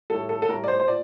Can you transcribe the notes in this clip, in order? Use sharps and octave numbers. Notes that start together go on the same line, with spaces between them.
A2 G3 A4
A4
A4
A2 G3 A#4
D5
C5
C5
A#2 D5